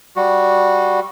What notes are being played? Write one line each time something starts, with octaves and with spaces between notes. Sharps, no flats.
G3 F#4